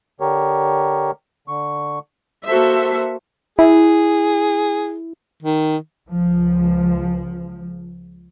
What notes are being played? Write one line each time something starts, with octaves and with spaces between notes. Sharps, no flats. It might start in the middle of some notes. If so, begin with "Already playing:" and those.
D3 G4 A#4 C#5
D3 C#6
A#3 F#4 A4 C5 E5
E4 G#4
D#3
C#2 F3